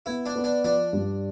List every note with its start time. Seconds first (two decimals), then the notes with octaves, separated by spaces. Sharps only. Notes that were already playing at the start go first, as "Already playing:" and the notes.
0.06 B3 E4
0.26 D4
0.36 B3
0.44 D4
0.64 F3 D4
0.93 G2